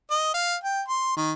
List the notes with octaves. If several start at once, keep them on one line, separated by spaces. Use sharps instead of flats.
D#5
F5
G5
C6
D#3